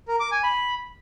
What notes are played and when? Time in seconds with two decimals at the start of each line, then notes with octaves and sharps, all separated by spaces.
0.08 A#4
0.20 D6
0.32 G#5
0.43 B5